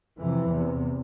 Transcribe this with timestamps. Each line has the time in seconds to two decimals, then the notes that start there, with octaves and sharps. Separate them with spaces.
0.18 F2 C3 E3
0.50 E2 C3